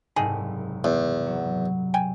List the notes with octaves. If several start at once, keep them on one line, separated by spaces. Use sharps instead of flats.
F#1 C2 G#2 D#3 G#4 A4
E2
F#3
G5 G#5